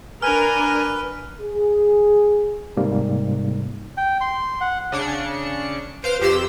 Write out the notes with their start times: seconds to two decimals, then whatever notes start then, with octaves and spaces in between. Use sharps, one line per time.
0.22 D4 A#4 B4 G#5 F6
1.41 G#4
2.77 G#2 C3 G3 A#3
3.97 G5
4.21 C6
4.61 F#5
4.92 C#3 D4 C#7
6.04 B4 C5 F5 D7
6.21 F2 G4 C5 E6